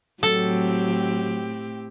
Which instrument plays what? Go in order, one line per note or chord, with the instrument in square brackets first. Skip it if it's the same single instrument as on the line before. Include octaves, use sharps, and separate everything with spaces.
[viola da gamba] A2 C4 G4 [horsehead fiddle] F#3 [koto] A4